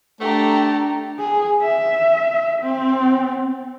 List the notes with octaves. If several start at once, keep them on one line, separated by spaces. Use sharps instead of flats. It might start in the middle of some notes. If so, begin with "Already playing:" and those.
A3 D4 G4 A4 A#5
G#4
E5
C4